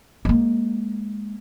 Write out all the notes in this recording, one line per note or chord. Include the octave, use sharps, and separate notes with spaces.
G#3 A#3